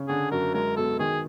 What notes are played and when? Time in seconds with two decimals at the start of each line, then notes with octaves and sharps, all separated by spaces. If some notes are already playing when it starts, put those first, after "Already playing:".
Already playing: C#3
0.08 D3 G#4
0.31 F#2 A#4
0.54 G#3 A#4
0.77 B2 A4
0.99 D#3 G#4